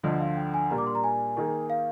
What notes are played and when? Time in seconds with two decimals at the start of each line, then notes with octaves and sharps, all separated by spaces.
0.03 D2 D3 F3 D#5
0.20 F5
0.36 G5
0.54 G#5
0.71 A#2 G3 A#3 D4 A#5
0.78 D6
0.87 C6
0.95 A#5
1.04 G#5
1.36 D#3 A#3 D#4 G#4
1.70 F5